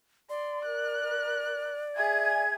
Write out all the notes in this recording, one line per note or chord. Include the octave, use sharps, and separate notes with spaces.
D5 C6
A#4 F#6
G#4 E5 G#5 G#6